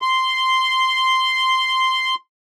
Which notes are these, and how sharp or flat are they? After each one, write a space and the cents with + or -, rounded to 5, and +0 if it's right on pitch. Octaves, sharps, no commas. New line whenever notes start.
C6 -5